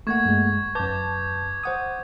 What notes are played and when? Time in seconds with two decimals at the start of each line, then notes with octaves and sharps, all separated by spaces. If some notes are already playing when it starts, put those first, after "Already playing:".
0.07 A3 A#3 F#5 C#6 G#6
0.25 G2 G#3
0.75 F#2 B4 A5 D6 G6
1.64 C5 F#5 D#6